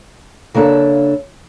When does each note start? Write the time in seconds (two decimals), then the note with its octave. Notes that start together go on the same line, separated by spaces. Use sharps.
0.54 C#3 A#3 D4 A4 E5